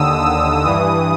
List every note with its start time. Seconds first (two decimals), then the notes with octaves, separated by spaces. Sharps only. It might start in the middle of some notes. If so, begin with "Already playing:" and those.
Already playing: D#2 D3 D#6 E6
0.20 E6
0.64 G2 E3 D#6